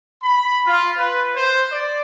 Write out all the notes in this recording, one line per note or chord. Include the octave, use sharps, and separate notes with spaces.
B5
F4
B4
C5
D5